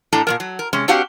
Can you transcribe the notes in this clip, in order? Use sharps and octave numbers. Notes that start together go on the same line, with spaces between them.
A2 D4 A4 A5 A#5
A#2 G#3 A#4
F#3
A#4
C3 G#3 C#4
C4 D4 F#4 G4 F5 F#5